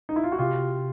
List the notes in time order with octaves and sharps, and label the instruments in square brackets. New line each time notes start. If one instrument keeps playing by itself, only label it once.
[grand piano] D#4
E4
F4
F#4
[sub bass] C3 [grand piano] F4 G4